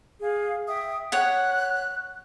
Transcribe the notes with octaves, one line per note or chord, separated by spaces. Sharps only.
G#4 F5
E5 G5 D#6
C#5 F#5 F#6